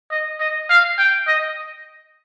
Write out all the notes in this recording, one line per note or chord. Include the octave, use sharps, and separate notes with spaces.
D#5
D#5
F5
G5
D#5